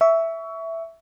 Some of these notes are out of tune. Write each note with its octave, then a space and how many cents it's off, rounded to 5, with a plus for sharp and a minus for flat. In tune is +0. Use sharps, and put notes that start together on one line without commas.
E5 +0 C#6 +25